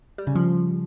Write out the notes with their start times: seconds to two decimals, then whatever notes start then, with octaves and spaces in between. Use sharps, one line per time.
0.18 G3
0.27 C#3
0.36 F3